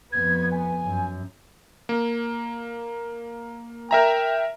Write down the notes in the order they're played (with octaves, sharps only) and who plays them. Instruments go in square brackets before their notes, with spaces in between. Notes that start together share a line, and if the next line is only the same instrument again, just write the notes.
[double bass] F2 B3 [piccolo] G#6
[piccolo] G#5
[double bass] F#2
[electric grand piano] A#3
[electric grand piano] A#4 E5 A#5 [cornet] G5